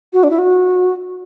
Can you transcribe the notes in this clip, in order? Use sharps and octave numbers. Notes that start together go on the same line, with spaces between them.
F#4
D4
E4
F#4